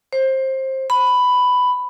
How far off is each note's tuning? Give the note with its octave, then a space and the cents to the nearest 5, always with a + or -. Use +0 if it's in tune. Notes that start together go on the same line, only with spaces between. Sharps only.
C5 +20
B5 +10